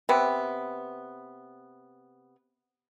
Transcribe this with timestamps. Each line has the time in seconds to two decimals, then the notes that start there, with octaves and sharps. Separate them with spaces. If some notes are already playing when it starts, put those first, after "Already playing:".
0.09 C3 B3